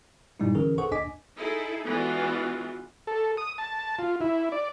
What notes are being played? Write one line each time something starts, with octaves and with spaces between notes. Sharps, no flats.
G2 A#2 G3 G#3 D#4 E4
D3 E3 C#4 G#4 A#4
G#4 A4 B4 C5 F#5 C#6
D#2 D4 D#5 G#5 D6 B6
D#4 E4 G#4 A4
E3 G#3 B3 D4 F4 F#4
A4
D#6
A5
F4
E4
D5